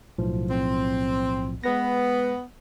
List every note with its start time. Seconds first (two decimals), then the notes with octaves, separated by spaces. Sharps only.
0.19 B1 A2 F3
0.49 C4
1.64 G#3 B3 B4 A#6